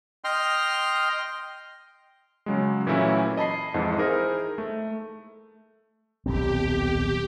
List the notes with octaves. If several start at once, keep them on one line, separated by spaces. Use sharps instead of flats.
D#5 G5 C6 F6
C#3 F#3 G#3
A#2 E3 F#3 A3 C#4 E4
D#5 A5 B5 C7
F2 G#2 E3
D#4 E4 G#4 A#4 C5
A3
D#1 B1 C4 G4